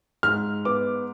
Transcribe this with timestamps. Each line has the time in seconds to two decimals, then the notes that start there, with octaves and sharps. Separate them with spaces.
0.23 G#2 F6
0.65 B3 D6